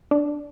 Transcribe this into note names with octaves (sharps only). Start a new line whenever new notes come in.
D4